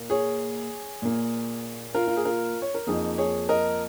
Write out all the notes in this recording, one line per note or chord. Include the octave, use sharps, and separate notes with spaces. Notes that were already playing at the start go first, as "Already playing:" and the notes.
Already playing: A#2 A#3
G#4 C#5
A#2 A#3
F4 A#4
F4
G#4
F4 A#4
C#5
A#4
F2 F3 A#3 D#4 G#4
G#4 C#5
A#4 D#5